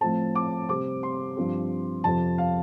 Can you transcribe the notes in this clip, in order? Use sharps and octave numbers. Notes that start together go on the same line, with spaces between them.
A2 F3 A3 C4 A5
D6
C3 G3 C4 D6
C6
G2 F3 C4
F2 C3 F3 A5
F5